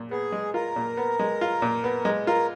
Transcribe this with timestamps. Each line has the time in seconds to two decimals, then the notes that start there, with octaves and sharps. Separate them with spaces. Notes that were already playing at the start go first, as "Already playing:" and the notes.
Already playing: A#2
0.11 B3 G#4
0.32 G#3
0.54 F4 A#4
0.76 A#2
0.97 B3
1.19 G#3
1.41 F4
1.62 A#2
1.84 B3
2.05 G#3
2.27 F4 A#4